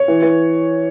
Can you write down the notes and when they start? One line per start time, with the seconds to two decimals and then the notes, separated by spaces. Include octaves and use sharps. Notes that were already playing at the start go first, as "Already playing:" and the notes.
Already playing: C#5
0.08 E3
0.22 E3